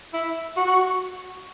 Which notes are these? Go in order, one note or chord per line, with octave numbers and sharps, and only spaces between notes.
E4
F#4
F#4